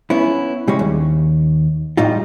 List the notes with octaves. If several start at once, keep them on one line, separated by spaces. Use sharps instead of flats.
B3 C#4 E4
C#3 G3 G#3 C#4
D#2
A2 G3 D#4 F4